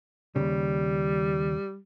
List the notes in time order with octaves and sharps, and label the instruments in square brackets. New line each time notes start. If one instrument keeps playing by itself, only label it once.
[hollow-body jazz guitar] D#2 A2 C#3 [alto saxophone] G3